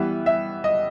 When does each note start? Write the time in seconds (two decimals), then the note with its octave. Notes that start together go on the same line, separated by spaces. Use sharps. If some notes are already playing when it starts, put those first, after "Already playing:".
Already playing: E3 G3 B3 E5
0.26 E5
0.64 D#5